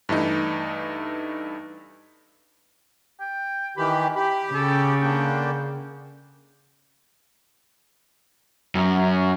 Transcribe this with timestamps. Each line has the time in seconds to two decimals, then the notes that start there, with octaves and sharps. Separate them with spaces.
0.09 G2 E3 A3 D#4
3.21 G5
3.77 D#3 E3 G4 B5
4.16 G4 B5
4.54 C#3 A4
5.02 D3 A#3 D4 G5
8.75 F#2